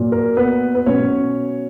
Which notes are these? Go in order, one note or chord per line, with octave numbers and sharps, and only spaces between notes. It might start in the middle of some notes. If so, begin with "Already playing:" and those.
Already playing: A#2 F#3
A#4
B3 B4
B4
B2 F#3 C#4 C#5